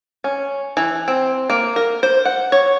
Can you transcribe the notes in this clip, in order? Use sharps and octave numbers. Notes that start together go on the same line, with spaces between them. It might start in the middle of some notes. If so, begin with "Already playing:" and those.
C#4
E3
C4
A#3
A#4
C5
F#5
C#5